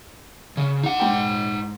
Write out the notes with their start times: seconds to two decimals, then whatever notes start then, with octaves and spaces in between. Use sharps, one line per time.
0.57 C#3
0.83 D#4 F#5
1.00 G#2 G5